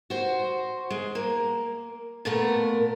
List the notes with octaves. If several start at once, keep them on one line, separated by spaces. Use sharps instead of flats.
F#4 C5
G#3
A#3
A#2 A3 B3 A#4